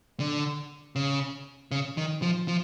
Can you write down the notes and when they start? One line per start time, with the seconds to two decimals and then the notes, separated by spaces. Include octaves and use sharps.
0.20 D3
0.96 C#3
1.71 C#3
1.97 D#3
2.22 F3
2.48 F3